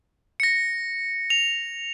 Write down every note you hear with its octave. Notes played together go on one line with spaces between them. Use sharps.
A#6 C#7
F7